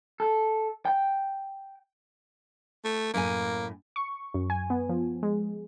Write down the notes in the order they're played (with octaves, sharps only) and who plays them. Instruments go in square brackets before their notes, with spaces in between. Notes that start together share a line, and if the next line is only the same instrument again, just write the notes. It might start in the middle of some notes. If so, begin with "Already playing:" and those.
[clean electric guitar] A4
G5
[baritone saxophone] A3
[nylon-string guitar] F#2 A2 G#5 [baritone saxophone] A#3
[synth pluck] C#6
F#2
G#5
B3
F3
G#3